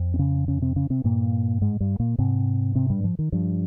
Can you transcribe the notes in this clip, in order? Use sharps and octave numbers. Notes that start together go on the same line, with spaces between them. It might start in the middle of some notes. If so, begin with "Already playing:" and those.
Already playing: F2
C4
C#3 C#4
C#3 C#4
C3 C4
C#3 C#4
C3 C4
G2 A#2 A#3
G#2 G#3
G2 G3
A#2 A#3
G#2 C3 C4
C3 C4
G2 G3
F3
D#3
G2 F3